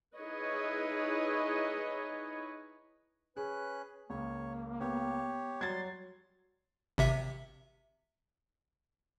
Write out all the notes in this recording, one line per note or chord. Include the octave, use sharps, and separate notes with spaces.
D#4 E4 G#4 B4 C#5 D#5
C#4 G#4 B4 F#6
C#2 A#3 C#5
B3 G4 C#5
F#3 G3 C6 G#6 A6
G#1 C3 E5